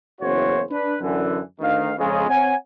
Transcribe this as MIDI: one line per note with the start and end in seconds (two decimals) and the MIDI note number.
0.21 0.62 30
0.21 0.62 40
0.21 0.62 61
0.21 0.62 66
0.21 0.62 72
0.21 0.62 73
0.71 0.95 62
0.71 0.95 71
1.01 1.39 42
1.01 1.39 50
1.01 1.39 52
1.60 1.92 38
1.60 1.92 51
1.60 1.92 77
1.98 2.28 41
1.98 2.28 49
1.98 2.28 56
2.28 2.54 60
2.28 2.54 73
2.28 2.54 78
2.28 2.54 80